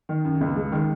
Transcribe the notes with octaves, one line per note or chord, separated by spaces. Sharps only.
D#3
F#2
C#2
G#3
D#3